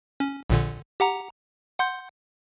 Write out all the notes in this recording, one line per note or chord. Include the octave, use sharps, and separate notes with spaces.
C#4
A#1 A#2 D3
G4 F#5 A#5
F#5 C6 G6